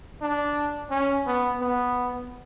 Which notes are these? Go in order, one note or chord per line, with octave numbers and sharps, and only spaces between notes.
D4
C#4
B3
B3